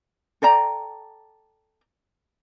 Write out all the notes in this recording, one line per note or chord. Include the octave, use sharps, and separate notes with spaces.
A4 D5 G5 A#5